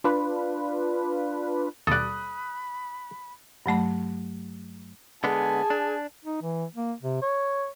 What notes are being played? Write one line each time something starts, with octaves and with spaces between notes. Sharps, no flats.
D4 F4 B4
D#2 B2 G3 A4 D5 B5 D#6 F#6
G2 F#3 A3 B5
D3 G#3 B3 G#4 G#5 A5
D4
D#4
E3
A#3
C3
C#5